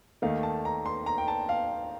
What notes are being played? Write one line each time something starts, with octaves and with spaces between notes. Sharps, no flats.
D#2 D#3 A3 F5
A5
A#5
C6
A#5
G5
A5
F5